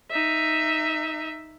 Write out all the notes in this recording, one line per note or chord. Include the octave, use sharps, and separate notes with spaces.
D#4 E5